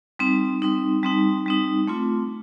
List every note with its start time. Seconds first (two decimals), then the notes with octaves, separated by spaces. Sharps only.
0.19 G3 C4 D#4
0.62 G3 C4 D#4
1.03 G3 C4 D#4
1.46 G3 C4 D#4
1.87 A3 C4 F4